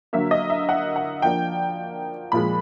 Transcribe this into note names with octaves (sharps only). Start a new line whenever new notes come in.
D3 F#3 A#3 E5
D#5
E5
F#5
F#5
F3 A#3 D4 G5
A#2 F3 G#3 B5